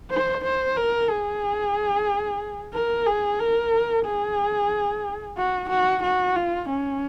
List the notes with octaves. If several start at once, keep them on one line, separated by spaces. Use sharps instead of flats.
C5
C5
A#4
G#4
A#4
G#4
A#4
G#4
F#4
F#4
F#4
F4
C#4